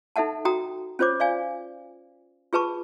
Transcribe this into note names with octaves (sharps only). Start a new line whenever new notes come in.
D#4 A4 E5 F#5 A5
F#4 G5 A#5 D#6
C#4 F4 C5 C#5 D6
D5 F5 G#5
F4 G#4 B4 A5 C#6